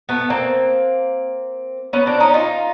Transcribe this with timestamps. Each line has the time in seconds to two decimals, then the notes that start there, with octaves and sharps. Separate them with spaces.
0.09 A3 B3
0.30 A#3 C4
1.93 B3 C#4
2.07 C4 D4
2.20 C#4 D#4
2.34 D#4 F4